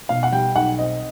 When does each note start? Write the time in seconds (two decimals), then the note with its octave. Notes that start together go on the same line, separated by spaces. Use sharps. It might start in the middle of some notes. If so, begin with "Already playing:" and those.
0.09 B2 F5
0.23 F#5
0.32 G3 G5
0.55 B1 F#5
0.78 C4 D#5